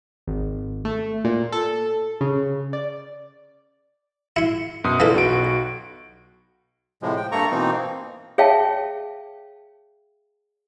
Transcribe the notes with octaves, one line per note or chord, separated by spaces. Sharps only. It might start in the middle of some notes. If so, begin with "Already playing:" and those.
G#1
A3
A#2
A4
C#3
D5
E4 C6 C#7
F#2 B2 D#6
E3 A#3 F4 A4 D5
B1 F#4 D7
A2 C3 F3 G#3
G5
G2 A3 A#3 A4 A#5 C#6
B2 E3 A#3 C4 D#4
G#4 C#5 E5 F5 G5 A5